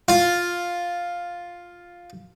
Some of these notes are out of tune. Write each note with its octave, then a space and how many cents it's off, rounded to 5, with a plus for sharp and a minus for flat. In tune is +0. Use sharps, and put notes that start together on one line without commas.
F4 +5